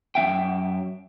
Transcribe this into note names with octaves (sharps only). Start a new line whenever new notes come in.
F#2 B3 E5 G5